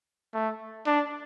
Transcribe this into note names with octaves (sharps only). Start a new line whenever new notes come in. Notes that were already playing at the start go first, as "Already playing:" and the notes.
A3
D4